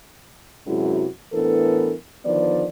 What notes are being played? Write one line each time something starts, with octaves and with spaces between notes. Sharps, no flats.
F#2 C3 G#3 E4 F#4
A2 E3 B3 D4 A4 A#4
D3 D#3 F3 B3 D5